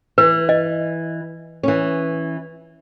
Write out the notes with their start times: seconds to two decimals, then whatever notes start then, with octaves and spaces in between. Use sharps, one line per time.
0.18 E3 B4
0.49 D#5
1.63 E3 C#4